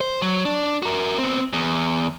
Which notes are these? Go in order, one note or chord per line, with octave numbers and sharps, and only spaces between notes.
C5
F#3
D4
F#4 A#4
B3 C4
E2